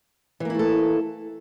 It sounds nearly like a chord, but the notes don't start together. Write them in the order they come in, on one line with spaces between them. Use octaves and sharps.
E3 A#3 E4 A3 A4